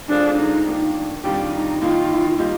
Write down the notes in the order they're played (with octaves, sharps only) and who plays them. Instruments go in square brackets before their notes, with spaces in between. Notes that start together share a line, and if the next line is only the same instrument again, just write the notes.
[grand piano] D3 G#3 C4 F4 G#4 [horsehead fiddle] D4
[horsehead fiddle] D#4
[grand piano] D#3 A#3 D4
[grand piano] F2 D#3 G3 D4 F4 [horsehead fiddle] G4
[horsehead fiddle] D#4
[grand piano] D#3 A#3 D#4 [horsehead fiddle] F4
[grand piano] G3 A#3 D#4 G4